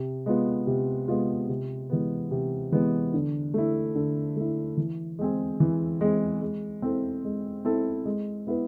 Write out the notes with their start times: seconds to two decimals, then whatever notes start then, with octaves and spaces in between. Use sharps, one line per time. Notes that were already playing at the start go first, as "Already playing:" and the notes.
Already playing: C3
0.26 G#3 B3 F4
0.67 C3
1.08 G#3 B3 F4
1.49 C3
1.90 E3 G#3 B3
2.31 C3
2.72 E3 G#3 B3
3.14 D3
3.54 A3 E4
3.95 D3
4.36 A3 E4
4.77 E3
5.19 G#3 C4 G#4
5.60 E3
6.01 G#3 C4 G#4
6.42 G#3
6.82 C4 E4 A4
7.24 G#3
7.65 C4 E4 A4
8.05 G#3
8.47 B3 E4 B4